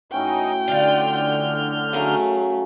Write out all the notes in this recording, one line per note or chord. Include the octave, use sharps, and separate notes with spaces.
A2 C#4 D#4 F#4 G5
D3 D4 F4 F6 G6
C#3 F#3 A3 G#4 A#4 A#5